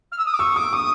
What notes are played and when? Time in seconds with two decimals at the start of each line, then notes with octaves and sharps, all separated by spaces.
0.11 F6
0.18 E6
0.25 D#6
0.33 D6
0.39 C#6 E6
0.56 D6 D#6
0.73 C#6 D#6